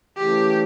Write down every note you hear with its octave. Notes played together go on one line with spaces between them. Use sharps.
C#3 E3 A3 G4